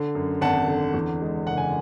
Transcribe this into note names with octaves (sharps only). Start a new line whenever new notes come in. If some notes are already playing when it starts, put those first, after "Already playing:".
Already playing: D3
F#2
G#1 F#5 A5
D3
E2
G#3
F#1 F#5
G#5